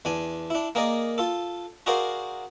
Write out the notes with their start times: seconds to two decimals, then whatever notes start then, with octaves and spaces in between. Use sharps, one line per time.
0.05 E2 D4 G#5
0.50 D4 E4
0.75 A#3 G#4 A#4 D5 D#5
1.18 F4 A4
1.86 F#4 G#4 A#4 C5 D5 F5